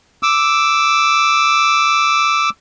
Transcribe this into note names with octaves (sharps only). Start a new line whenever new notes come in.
D6 E6